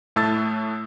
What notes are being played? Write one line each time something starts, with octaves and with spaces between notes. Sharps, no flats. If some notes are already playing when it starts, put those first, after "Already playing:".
A2 A3 A5 E6 A6